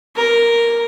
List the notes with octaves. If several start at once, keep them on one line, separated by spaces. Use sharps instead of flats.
A#4